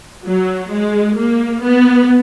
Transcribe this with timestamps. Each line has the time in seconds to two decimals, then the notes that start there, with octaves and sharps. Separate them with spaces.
0.25 F#3
0.71 G#3
1.17 A#3
1.62 B3